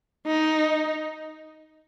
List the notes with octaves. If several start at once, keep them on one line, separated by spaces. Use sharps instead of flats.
D#4